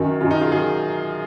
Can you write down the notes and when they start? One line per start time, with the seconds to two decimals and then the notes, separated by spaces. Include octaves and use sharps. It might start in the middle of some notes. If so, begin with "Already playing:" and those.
Already playing: F#2 D#3 F#3
0.20 F#2 D#3 F#3 F4
0.31 D#4
0.41 F4 G#4
0.51 D#3 F#3 F4 G#4